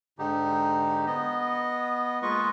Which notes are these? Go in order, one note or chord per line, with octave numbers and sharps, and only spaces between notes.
G#2 D3 D#4 G4
B3 D#5
G#3 A#3 F4 B4 D#5 C#6